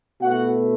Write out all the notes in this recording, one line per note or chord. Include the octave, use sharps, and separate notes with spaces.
B2 A3 E4 F#4 F#5